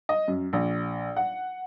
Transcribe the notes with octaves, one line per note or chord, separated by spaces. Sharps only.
D#5
F#2
A#1
F#5